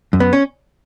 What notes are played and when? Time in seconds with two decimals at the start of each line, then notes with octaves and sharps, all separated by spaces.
0.13 F#2
0.20 B3
0.33 C#4